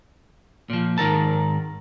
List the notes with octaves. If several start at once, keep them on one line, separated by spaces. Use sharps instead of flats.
A#2 F3
G#2 D#3 A#4 A5